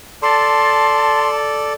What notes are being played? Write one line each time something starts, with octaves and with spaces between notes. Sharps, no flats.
A4 D5 A5 C6